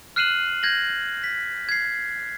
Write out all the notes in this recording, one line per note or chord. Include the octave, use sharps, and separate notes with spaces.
F6 F#6 C7 D#7 E7 F#7
G6 G#6 A#6 F#7
B6
G#6 C7